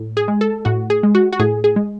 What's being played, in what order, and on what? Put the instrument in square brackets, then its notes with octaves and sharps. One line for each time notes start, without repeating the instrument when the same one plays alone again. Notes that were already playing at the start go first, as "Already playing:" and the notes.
Already playing: [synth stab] A2
G#4
G#3
A4
A2 F#4
G#4
G#3
F#4
F#4
A2 G#4
G#4
G#3